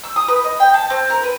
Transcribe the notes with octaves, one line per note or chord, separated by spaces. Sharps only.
E6
D#6
B4
D#5
G5
A5
C4
A#4
B4